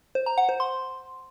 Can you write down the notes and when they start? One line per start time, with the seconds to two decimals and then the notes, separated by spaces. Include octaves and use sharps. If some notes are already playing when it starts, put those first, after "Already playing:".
0.15 C5
0.26 A#5
0.38 F#5
0.49 C5
0.60 C6